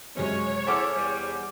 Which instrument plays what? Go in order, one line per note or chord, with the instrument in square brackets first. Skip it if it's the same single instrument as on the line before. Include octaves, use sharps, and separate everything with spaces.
[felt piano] F#2 C3 G#3 [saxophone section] C#4 [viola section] C#5
[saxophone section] E4 A4 [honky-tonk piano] G#4 D6 F6 [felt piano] C5 F#5
[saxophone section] E2 G3